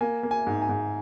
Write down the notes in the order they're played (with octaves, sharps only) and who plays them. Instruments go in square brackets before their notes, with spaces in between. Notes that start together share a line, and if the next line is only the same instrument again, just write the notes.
[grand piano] A#3 G#5
A#3
G#5
G#2
G#5
G#2